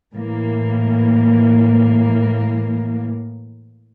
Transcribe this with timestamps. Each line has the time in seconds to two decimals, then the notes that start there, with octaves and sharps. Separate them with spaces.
0.13 A2 E3 A#3